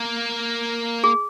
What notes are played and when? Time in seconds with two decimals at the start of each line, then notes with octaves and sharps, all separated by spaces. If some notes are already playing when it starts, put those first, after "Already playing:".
Already playing: A#3
1.04 G#4